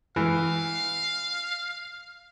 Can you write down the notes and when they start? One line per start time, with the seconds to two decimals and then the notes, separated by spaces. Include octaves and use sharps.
0.16 E3 F5